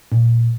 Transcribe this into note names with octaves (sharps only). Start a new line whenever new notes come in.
A#2